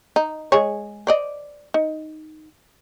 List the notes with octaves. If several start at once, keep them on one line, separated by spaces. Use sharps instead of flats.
D#4
G#3 G#4 C#5
C5 D5 D#5
D#4